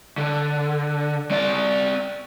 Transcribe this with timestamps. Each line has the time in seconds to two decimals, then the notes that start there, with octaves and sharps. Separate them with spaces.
0.18 D3
1.31 C4 D5